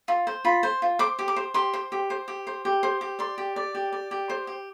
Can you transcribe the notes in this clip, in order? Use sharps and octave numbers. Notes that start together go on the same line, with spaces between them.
F4
C5
F4 B5
C5
F4
C5 D6
G4
D6
C5
G4 C6
C5
G4
C5
G4
C5
G4
C5
G4
D5 C6
G4
D5
G4
D5
G4
C5
G4